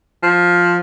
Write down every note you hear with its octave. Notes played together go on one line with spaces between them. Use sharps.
F3